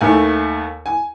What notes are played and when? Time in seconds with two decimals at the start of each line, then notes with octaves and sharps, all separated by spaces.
0.01 D#2 D#3 A3 G#5
0.86 G#5